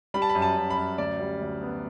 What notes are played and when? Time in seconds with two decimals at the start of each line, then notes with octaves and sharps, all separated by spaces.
0.14 G3 B5
0.22 A5
0.29 B5
0.35 F#2
0.42 A5
0.56 F#2
0.70 B5
0.77 F#2
0.98 D2 D5
1.19 G3
1.41 D2
1.61 B3